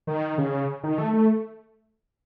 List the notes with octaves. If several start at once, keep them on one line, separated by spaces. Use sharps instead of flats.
D#3
C#3
D#3
A3
A3